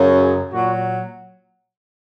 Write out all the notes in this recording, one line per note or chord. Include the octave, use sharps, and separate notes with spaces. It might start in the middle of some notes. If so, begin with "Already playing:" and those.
Already playing: F#2 C#3 F#3
G#4
A#2 F#3 F#4